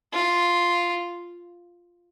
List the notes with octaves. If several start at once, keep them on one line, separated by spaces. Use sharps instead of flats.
F4